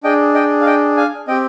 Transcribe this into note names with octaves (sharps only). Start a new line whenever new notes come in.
D4 G#4 D#5 G5
D#5 G5
F5
D#5 G5
F5 G#5
C4 G4 D#5 G5